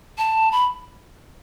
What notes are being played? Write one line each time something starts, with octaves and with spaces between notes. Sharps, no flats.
A5
B5